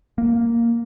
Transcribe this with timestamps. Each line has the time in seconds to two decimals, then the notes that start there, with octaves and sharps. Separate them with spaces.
0.18 A#3